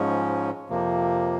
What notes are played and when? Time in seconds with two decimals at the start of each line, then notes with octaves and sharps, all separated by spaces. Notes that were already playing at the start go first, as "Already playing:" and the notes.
Already playing: G#2 F3 G#3 C#4
0.69 F2 C3 F3 A#3